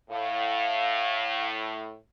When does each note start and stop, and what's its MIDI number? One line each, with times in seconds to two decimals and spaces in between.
0.10 1.96 45
0.10 1.46 77